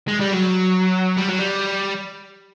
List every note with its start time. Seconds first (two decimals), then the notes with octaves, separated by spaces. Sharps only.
0.08 G#3
0.20 G3
0.32 F#3
1.17 G3
1.28 F#3
1.39 G3